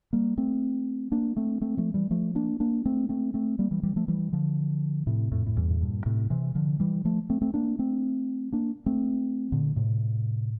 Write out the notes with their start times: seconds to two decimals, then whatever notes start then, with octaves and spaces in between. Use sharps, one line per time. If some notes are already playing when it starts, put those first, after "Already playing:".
0.13 G3 A#3
0.37 A3 C4
1.12 A#3 D4
1.37 A3 C4
1.61 A3 C4
1.77 F3 A3
1.94 E3 G3
2.11 F3 A3
2.35 A#3 D4
2.60 A#3 D4
2.85 A3 C4
3.09 A3 C4
3.34 A3 C4
3.59 G3 A#3
3.71 E3 G3
3.83 E3 G3
3.96 F3 A3
4.08 E3 G3
4.33 D3 F3
5.07 A2 C3
5.32 F2 A2
5.46 A2
5.56 E2 G2
5.70 A2
5.81 G2 A#2
6.06 A2 C3
6.30 C3 E3
6.55 D3 F3
6.80 E3 G3
7.05 F3 A3
7.30 A3 C4
7.42 A3 C4
7.54 A#3 D4
7.79 A3 C4
8.52 A#3 D4
8.86 A3 C4
9.52 A#2 D3
9.76 A2 C3